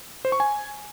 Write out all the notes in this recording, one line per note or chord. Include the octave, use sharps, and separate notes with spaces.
C5
C#6
G#5